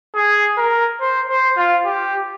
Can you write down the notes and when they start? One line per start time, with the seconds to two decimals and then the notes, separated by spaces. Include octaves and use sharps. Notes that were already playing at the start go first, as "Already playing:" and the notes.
0.15 G#4
0.57 A#4
1.01 C5
1.29 C5
1.57 F4
1.85 G4